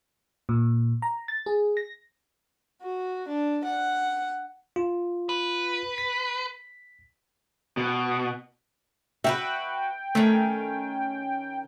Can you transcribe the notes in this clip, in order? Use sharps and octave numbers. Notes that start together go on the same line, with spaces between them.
A#2
A#5
A6
G#4
A#6
F#4
D4
F#5
F4
B4
B6
B2
F#4 A#4 B4 E5 G5
D#3 A3 C#4